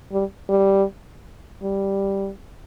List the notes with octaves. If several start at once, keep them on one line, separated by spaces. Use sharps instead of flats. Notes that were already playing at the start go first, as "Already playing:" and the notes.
G3
G3
G3